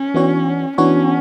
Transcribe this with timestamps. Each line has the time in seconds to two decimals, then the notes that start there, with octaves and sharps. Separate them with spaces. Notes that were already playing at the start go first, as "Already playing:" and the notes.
Already playing: C#4
0.14 E3 B3 D4 F#4 C#5
0.78 E3 B3 C#4 D4 F#4 C#5